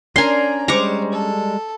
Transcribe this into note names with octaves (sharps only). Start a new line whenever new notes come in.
C#4 D4 A#4 D5 G#5 A#5 C6
G3 G#3 C5 A#5 C#6 D6
A4